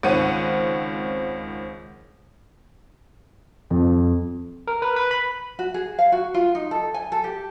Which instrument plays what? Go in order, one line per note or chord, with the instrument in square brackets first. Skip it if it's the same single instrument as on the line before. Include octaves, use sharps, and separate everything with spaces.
[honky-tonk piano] C#2 D#3 C4 C#5 F#5 D#7
[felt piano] F2
[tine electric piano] A#4
B4
B4
B5
[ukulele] F#4
G#4
F5
F#4
F4
D#4
A4
G#5
A4
G4